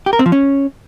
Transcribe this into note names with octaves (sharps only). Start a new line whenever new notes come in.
G4
A#4
C4
F3
C#4